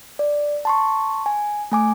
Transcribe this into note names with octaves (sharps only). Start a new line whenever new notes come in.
D5
A5 C6 C#6
G#5
A3 G#5 D6